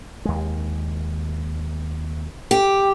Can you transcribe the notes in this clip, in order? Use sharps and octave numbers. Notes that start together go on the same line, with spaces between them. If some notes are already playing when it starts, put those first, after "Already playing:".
D#2 G#3
G4